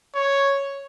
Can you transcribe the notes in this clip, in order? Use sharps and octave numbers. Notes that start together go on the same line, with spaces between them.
C#5